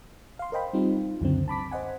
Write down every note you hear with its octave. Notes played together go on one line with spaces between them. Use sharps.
F5 C6
A#4 C5 D#5 G5 B5
G3 C4 D#4 F4
C#2 F#2 D3 C4
A5 B5 D6 B6
C5 D#5 F#5 G#5